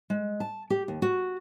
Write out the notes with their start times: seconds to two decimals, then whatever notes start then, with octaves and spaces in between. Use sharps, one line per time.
0.10 G#3
0.40 A5
0.70 G4
0.88 D#2
1.02 F#4